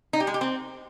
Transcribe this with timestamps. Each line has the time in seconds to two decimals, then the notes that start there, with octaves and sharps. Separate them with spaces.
0.13 D#4
0.20 G4
0.27 G#3
0.34 G4
0.41 C4